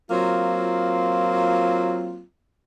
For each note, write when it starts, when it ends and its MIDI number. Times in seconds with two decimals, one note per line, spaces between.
0.11 2.23 54
0.11 2.23 58
0.11 2.23 60
0.11 2.23 65